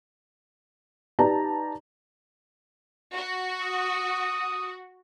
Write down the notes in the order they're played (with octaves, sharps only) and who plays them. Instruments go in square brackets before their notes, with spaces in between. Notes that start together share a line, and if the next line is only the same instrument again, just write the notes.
[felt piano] D#4 G4 B4 D5 A5 A#5
[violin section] F#4
[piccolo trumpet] D#6